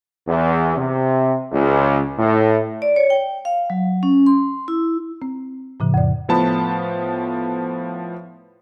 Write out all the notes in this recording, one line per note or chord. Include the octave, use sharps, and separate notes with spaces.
E2
C3
C#2
A2
D5
C#5
G5
F5
F#3
C#4
C6
E4
C4
A2 C#3 F3
F2 D5
A2 F3 B3 A5 B5